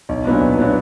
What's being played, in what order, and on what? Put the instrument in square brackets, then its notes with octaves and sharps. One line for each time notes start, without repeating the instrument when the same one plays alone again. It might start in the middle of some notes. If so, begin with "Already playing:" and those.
[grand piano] B1
A#2 F#3 B3 D4
B1
A#2 F#3 B3 D4